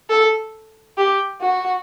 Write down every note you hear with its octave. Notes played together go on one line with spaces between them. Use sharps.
A4
G4
F#4